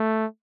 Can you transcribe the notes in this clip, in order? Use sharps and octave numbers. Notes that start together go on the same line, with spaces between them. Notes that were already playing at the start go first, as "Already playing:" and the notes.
Already playing: A3